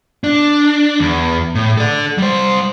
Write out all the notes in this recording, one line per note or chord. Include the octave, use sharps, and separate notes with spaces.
D4
E2
A2
A4 D5
G3 C5